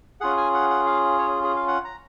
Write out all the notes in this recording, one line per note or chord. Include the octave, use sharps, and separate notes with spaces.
C#4 F4 G#4 F#5
G#5
F#5
F#5
F5
C#5
G#4
F5
F#5
A#5